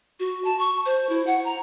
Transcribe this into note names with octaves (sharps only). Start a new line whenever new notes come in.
F#4
A5
C#6
C5
E4
F#5
A#5